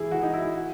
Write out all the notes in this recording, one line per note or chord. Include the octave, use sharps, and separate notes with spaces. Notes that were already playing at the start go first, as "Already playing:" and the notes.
Already playing: E3 E4 G#4
E3 F#4
D#4
E4
F#4